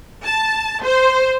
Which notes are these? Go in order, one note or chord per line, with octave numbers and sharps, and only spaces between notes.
A5
C5